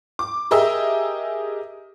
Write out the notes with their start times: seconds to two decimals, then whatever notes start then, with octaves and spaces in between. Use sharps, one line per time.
0.19 D6
0.51 G4 G#4 A#4 D#5 E5 E6